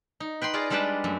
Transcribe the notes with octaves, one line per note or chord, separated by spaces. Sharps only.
D#4
B4 G5 B5 C6
F4 G#4 D5 D#5
G3 G#3 D4 B4 G5 A5
F#2 A3